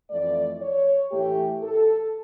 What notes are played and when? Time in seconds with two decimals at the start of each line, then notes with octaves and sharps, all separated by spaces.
0.10 F2 E3 A3 D5
0.62 C#5
1.12 A2 E3 A3 G4
1.63 A4